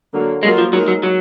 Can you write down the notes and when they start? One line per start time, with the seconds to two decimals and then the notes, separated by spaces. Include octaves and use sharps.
0.13 D3 F#3 A#3
0.42 F#3 G#3 A#3 F4 A#4
0.58 F3
0.73 F#3 G#3 D#4 A#4
0.88 F#3
1.03 F#3